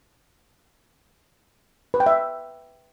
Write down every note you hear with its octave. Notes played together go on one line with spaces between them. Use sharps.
B4
G5
E5